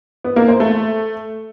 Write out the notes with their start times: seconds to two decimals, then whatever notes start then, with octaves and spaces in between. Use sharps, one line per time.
0.24 B3
0.36 A#3
0.48 C5
0.60 A3